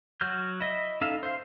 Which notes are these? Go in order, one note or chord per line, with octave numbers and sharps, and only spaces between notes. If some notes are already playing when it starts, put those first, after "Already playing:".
F#3 F#4 F6 G6
E4 D#5 E5
C#4 D#4 A4 E5 F5
C5 F5